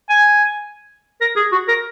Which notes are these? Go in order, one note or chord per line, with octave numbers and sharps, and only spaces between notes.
G#5
A#4
G#4
F#4
A#4